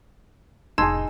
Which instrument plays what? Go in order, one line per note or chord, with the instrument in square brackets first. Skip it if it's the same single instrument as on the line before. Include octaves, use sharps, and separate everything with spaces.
[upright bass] F1 A2 [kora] D#4 G#4 [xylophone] A5 E6 G#6 [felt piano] C6